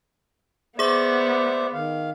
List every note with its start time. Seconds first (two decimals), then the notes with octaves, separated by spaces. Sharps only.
0.79 B3 G#4 C5 D5 E5 D6
1.73 D#3 F5